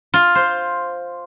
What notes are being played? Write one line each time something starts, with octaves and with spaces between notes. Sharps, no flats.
F4
C5